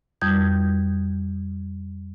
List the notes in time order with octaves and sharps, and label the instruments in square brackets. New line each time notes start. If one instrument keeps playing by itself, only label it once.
[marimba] F2 G3 D#6 G6 G#6